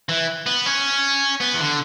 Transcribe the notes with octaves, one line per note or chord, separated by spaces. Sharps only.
E3
B3
C#4
B3
E3
D3